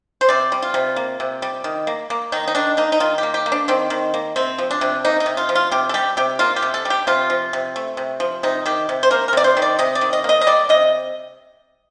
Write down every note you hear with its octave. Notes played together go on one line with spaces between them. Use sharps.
C5
C3 D5
G3
F4
C3
A#3
C3
G3
D#3
A#3
A#3
D#3 D#4
D#4
D#3 D4
A#3 D#4
D#4
D#3 F4
A#3 G4
G4
A#3
D4
D#3 C4
D#3
A#3
C3 C4
F3
D4
C3
A#3 D#4
D#4
C3
F4
F3
F4
C3 G4
A4
G3 G4
C3 G4
A#3 F4
G4
C3
A4
G3
G4
C3 F4
F3
C3
A3
C3
F3
C3 D#4
D#3 G4
C3
C5
A#3 A#4
A#4
C3 D5
C5
D#3
D5
C3 D#5
D5
D#3
D#5
A#3 D#5
D#5
G3 D5
C3 D#5